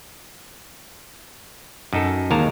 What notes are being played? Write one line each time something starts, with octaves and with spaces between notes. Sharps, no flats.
F#2 D#4 A4
D#2 G#3 A#4 A5 A#5